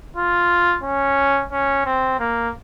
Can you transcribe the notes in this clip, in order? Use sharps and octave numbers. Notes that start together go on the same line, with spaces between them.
F4
C#4
C#4
C4
A#3